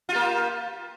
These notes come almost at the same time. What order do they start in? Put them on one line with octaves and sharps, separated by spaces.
F4 G4 A#3